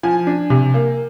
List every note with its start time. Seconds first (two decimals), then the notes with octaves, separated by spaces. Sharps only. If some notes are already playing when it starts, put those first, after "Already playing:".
0.03 F3 G#5
0.27 D4
0.50 C3
0.74 A#3